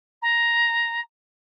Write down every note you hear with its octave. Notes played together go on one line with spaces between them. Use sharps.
A#5